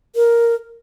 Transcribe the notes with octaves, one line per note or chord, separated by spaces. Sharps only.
A#4